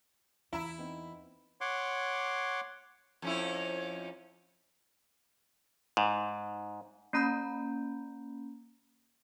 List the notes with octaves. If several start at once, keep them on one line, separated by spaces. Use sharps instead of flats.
E2 E4 A#5 B5 E6
B3 C4 D#4
C#5 F#5 C6 D6
F2 C#4 E4
G#2
A#3 C#4 A#5 B5 G6